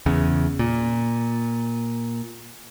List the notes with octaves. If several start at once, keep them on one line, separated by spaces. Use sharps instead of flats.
E2 C#3
A#2